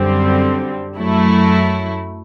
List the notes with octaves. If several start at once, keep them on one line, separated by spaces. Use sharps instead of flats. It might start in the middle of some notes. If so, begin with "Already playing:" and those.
Already playing: F#2 D3 G3 C4
F#2 F#3 A3 E4